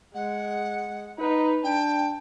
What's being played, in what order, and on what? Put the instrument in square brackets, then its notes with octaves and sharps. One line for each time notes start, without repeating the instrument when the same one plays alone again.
[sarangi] G#3 [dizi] F#5
[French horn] D#4 [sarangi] B4
[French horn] D4 [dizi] G5 [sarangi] A5